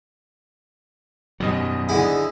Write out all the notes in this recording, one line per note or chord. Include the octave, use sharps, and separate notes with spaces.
G#1 F#2 B2 F#3 G3 D#5
D3 E4 G#4